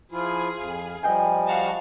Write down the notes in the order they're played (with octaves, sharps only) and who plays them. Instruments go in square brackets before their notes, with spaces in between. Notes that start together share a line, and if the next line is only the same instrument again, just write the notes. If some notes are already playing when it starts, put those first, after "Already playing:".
[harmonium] F3 E4 F4 [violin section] G#4
[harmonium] F2 F5
[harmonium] F3 G3 [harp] D#5 G5 G#5
[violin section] F#4 F5 A5